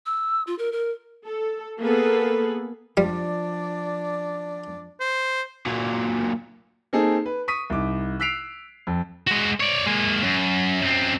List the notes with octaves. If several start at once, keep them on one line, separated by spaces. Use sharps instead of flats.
E6
F4
A#4
A#4
A4
A#3 B3 G#4 A4 B4
F3 G3 D4 D5
C5
A#2 F#3
A#3 C4 D#4 G#4 A4
B4
C#6 D#6 B6 D#7
C2 D#4 D6
E6 F#6 B6 C7 D7 F7
F2
G#3 F#4
C#5 D5
G#3 A#3
F#2
F#2 C4